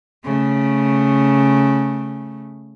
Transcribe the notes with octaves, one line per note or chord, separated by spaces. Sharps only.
C#3 A3